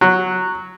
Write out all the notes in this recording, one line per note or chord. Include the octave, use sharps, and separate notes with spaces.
F#3